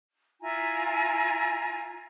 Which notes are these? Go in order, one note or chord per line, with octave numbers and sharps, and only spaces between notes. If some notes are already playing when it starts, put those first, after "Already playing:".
E4 F4 G#5 A#5